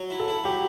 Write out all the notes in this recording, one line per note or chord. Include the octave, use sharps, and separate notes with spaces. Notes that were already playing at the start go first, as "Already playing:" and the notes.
Already playing: F#3
E4
A4
E4
F#3 G4